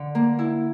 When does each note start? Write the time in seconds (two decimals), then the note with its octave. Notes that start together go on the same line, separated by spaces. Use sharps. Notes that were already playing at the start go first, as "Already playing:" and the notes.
Already playing: D3
0.15 A#3
0.39 E4